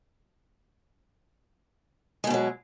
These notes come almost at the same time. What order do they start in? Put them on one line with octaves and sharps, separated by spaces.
G#3 B2 D#3 F#3